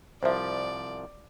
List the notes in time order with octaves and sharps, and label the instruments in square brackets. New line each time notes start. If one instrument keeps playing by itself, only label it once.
[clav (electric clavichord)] C2 F3 [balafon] C5 E5 [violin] D5